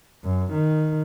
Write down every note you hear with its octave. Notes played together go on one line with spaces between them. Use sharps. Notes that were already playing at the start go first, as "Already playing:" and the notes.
F#2
D#3